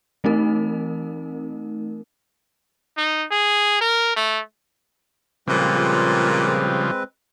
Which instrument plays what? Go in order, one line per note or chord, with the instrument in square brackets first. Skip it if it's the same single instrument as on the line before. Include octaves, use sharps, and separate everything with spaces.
[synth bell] E3 A3 C4 D#4 A#4
[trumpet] D#4
G#4
A#4
A3
[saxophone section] A#2 [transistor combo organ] C#3 F3 G3 [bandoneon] G#3 C4 B4